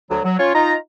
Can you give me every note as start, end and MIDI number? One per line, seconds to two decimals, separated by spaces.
0.10 0.19 38
0.10 0.19 54
0.24 0.35 54
0.39 0.51 61
0.39 0.51 65
0.39 0.51 73
0.54 0.74 63
0.54 0.74 65
0.54 0.74 82